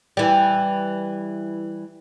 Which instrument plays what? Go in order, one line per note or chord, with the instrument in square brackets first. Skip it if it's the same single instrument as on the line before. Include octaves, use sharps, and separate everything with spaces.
[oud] E3 G3